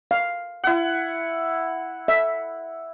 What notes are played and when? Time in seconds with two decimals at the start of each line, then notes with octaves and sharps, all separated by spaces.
0.11 F5
0.64 E4 F#5
2.08 E5